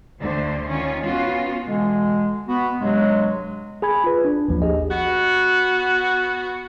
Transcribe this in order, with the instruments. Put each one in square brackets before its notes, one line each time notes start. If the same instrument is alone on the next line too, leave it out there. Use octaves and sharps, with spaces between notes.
[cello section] D2 D3 A3 C5
D#3 C#4 F4
B3 C#4 F4 F#4
[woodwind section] B2 D3 E3 G#3
B3 F#4
G2 C3 F#3 G#3
[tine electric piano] G#4 G#5 B5 G#6
F4 B4
D4
G#1 D#2 F3
G4 G#4 D#5
[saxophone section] B3 F#4